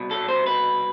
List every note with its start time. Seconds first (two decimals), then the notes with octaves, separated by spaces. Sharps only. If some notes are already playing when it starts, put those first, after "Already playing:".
Already playing: C2 B2
0.11 A4
0.28 C5
0.46 B4